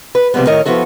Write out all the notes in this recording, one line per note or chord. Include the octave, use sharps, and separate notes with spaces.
B4
C3 F3 G3 G#3 B3
A2 D#3 A#4 C#5 D#5
F3 B3 E4 F#4 A4